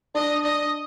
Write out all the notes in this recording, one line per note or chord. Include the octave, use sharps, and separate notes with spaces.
D4 D#5
D4 D#5